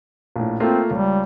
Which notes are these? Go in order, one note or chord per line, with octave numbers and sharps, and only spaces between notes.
A#1 A2
A3 A#3 C4 F4
C#2 G3